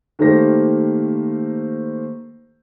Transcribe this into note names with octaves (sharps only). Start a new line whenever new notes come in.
D#3 A3 A#3 G4 C5 A#6